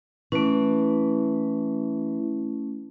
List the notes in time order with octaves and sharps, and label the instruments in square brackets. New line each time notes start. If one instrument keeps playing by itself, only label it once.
[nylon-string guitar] E3 [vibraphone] A3 C#4